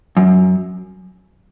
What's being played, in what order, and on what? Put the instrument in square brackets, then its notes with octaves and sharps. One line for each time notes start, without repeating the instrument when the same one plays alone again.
[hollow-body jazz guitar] F#2